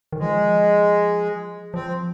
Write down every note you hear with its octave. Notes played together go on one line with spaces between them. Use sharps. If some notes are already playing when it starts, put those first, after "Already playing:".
D#3
F3 G#3
F3 C4